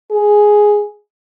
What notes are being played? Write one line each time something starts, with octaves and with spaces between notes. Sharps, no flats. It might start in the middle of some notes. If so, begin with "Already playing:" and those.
G#4